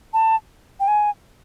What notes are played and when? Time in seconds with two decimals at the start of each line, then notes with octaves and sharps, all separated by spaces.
0.14 A5
0.80 G5
0.88 G#5